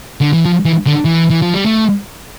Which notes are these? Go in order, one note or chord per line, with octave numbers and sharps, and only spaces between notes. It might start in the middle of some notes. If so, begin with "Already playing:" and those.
D3
E3
F3
E3
D3
E3
E3
F3
G3
A3